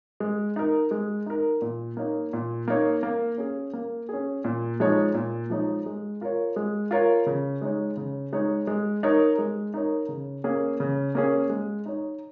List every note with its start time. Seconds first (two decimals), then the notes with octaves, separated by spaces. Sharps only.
0.20 G#3
0.56 D#4 A#4
0.91 G#3
1.26 D#4 A#4
1.62 A#2
1.97 A#3 D#4 C#5
2.33 A#2
2.68 A#3 D#4 C#5
3.03 A#3
3.38 C#4 G#4
3.73 A#3
4.09 C#4 G#4
4.44 A#2
4.80 F3 G#3 D#4 C#5
5.14 A#2
5.50 F3 G#3 D#4 C#5
5.86 G#3
6.21 F4 A#4 C#5
6.56 G#3
6.91 F4 A#4 C#5
7.26 C#3
7.61 G#3 D#4 C#5
7.97 C#3
8.32 G#3 D#4 C#5
8.67 G#3
9.03 D#4 A#4 C#5
9.38 G#3
9.74 D#4 A#4 C#5
10.08 C#3
10.44 A#3 C#4 G#4
10.80 C#3
11.15 A#3 C#4 G#4
11.49 G#3
11.86 D#4 C#5